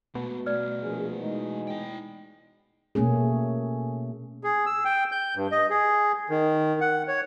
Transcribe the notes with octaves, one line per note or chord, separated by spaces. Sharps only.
B2 A3 A#3
A3 B3 D5 F6
A#1 G#4
E3 G#3 D#4
E4 G5
B2 A3 A#3 C#4 G#4
G#4
E6
G5
G6
G2
D#5
G#4
D#3
F#5
C#5